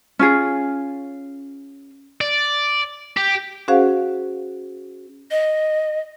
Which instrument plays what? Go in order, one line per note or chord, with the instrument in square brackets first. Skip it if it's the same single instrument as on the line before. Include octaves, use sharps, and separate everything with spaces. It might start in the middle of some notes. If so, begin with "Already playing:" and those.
[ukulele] C#4 F4 G#4
[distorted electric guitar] D5
G4
[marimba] C#4 F#4 G#4 C5 F5 F#5
[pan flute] D#5